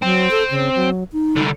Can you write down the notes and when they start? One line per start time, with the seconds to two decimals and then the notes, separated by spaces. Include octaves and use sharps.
0.03 F#3 C4
0.31 A4
0.51 C#3
0.75 F#3
1.12 D#4
1.36 C2 D3